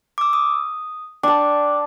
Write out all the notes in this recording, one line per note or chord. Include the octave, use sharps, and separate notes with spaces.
D6 E6
D#6
D4 G5 A5 D6